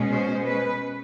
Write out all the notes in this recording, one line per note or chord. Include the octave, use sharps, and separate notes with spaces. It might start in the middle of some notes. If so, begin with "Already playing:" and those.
Already playing: B2 G#3 C#4
C5
B4